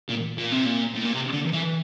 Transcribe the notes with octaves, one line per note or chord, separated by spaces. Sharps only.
A#2
A#2
C3
A#2
A2
A#2
C3
D3
E3